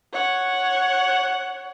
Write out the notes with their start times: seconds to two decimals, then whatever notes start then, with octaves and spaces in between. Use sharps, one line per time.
0.13 C#5 F#5